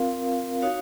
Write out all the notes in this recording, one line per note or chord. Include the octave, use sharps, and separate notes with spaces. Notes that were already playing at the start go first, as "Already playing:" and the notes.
Already playing: C4 F4 A#4 F5
D#4 F#4 C#5 F5